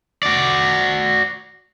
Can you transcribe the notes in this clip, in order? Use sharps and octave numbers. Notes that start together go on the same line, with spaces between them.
F#4 D5